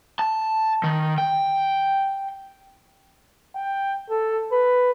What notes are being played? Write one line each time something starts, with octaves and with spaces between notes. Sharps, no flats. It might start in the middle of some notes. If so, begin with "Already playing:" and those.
A5
D#3
G5
G5
A4
B4